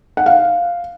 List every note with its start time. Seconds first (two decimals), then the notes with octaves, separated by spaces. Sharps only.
0.17 F#5
0.26 F5